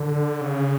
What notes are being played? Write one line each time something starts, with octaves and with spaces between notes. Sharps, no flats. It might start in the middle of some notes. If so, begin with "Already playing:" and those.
Already playing: D3
C#3